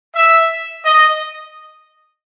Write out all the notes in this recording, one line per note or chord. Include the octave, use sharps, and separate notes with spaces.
E5
D#5